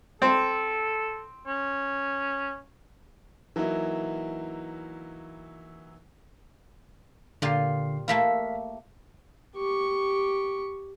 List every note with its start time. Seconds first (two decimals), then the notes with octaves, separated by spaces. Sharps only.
0.22 C4 A4
1.46 C#4
3.56 E3 F#3 A#3 D#4 E4
7.42 A#2 D3 F4 G4 C7
8.08 A3 A#3 E4 F5 B6
9.56 G4 C#6